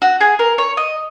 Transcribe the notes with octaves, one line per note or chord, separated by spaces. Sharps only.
F#4
G#4
A#4
C#5
D#5